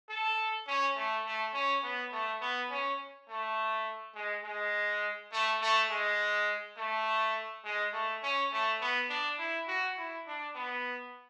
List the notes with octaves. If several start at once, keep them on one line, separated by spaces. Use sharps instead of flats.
A4
C#4
A3
A3
C#4
B3
A3
B3
C#4
A3
G#3
G#3
A3
A3
G#3
A3
G#3
A3
C#4
A3
B3
D4
E4
F#4
E4
D4
B3